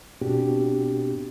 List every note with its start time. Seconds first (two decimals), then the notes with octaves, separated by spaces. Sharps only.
0.21 B2 B3 C4 D4 F#4 G4